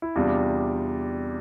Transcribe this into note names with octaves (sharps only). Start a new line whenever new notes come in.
E4
E2 C3 G3 D4 F4